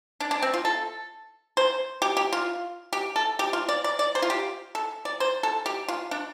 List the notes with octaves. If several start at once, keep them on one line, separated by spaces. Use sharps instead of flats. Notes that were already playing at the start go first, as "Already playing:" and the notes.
D4
D4
C4
F4
A4
C5
G4
G4
F4
G4
A4
G4
F4
D5
D5
D5
C5
F4
G4
A4
D5
C5
A4
G4
F4
D4